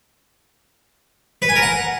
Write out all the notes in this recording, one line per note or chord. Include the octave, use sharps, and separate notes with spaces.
B4
G#5
A#4
F#5